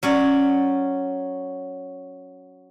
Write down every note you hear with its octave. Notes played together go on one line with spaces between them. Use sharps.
F#3 C#4 D5